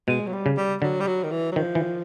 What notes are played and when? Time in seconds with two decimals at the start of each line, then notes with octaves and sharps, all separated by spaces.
0.08 B2 G#3
0.27 F#3
0.33 G3
0.46 C#3
0.57 G3
0.82 D3 F#3
1.00 G3
1.07 F#3
1.23 D#3
1.31 E3
1.52 F#3
1.56 D#3 F3
1.75 E3